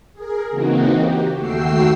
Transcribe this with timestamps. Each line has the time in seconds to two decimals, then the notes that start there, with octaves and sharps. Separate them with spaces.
0.13 G#4 A#4
0.50 C#3 E3 A#3 C4 D#4 F#4
0.92 G4
1.36 D#2 A3 F#4 G5 E6 C7